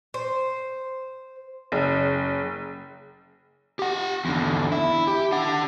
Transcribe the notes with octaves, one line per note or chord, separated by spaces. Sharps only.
C5
F#1
G4 F#5
E2 D3
E4
G4
D4 F#5